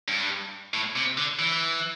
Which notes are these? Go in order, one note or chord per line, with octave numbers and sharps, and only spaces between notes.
G2
A2
C3
D3
E3